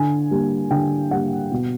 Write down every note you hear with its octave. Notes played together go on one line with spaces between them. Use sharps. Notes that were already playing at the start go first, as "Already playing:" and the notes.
Already playing: D3 G#5
G3 A#3
D3 G5
G3 A#3 F#5
B2